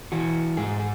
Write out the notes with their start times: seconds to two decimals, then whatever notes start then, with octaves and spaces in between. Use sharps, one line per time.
0.12 E3 F#4
0.57 G#2 G#4
0.80 G#4